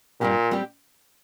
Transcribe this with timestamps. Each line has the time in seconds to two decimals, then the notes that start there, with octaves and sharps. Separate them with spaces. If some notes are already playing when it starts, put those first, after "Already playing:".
0.20 G2 A#2 G3 C4 G4
0.51 G3 C4 G4